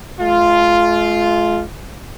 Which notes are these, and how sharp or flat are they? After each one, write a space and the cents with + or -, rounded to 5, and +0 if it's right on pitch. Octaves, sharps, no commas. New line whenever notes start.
G#3 +45 F4 +0